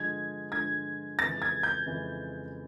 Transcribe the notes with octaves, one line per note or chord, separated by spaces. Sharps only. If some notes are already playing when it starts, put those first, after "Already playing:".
Already playing: G2 D3 F3 G#3 G#6
G2 D3 F3 G#3 G#6
F2 C#3 E3 G#3 C#4 A6
G#6
G6
F2 C#3 E3 G#3 C#4